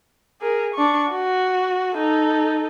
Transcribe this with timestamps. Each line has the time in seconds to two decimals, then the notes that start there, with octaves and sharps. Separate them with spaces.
0.42 G#4 A#4
0.75 D4 C#6
1.11 F#4
1.96 D#4 A4